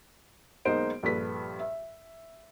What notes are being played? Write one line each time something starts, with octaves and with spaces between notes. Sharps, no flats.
B1 G#3 A#3 D#4 C5 D7
A#1 G2 A4 B4 B6
E5